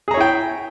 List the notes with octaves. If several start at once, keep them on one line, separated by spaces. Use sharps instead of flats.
E4 G#4 C#5 G5 A#5